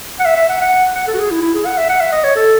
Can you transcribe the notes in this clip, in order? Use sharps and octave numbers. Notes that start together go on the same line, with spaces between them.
F#5
E5
E5
F#5
F#5
F#5
A4
F#4
G#4
E4
E4
G#4
F#5
E5
F#5
E5
D#5
C#5
A4